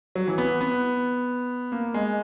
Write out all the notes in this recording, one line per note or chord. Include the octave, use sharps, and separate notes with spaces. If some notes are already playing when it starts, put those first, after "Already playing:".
F#3
E3
B3
B3
A#3
G#3